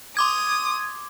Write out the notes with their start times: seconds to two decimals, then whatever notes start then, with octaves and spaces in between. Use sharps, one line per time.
0.17 C6 D6 D#6 G#6